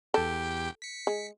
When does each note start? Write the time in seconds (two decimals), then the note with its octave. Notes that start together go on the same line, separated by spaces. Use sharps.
0.14 E2 G4 A4 G5
0.82 B6 C#7
1.07 G#3